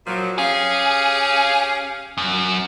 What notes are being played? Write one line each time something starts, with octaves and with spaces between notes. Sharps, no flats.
A#2 F3 F#3
C#4 G4 G#4 F5
F#2